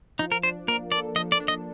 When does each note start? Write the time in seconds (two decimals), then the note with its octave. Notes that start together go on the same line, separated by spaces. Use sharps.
0.19 F3 D#4
0.32 A#4
0.43 D4 C5
0.68 A#3 A#4
0.92 A4 D5
1.16 F3 D#5
1.32 D5
1.40 D4
1.48 D#5